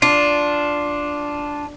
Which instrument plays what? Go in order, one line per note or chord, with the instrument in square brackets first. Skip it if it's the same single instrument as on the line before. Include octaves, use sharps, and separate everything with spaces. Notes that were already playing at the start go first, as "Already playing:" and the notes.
[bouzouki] D4 [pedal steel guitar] F4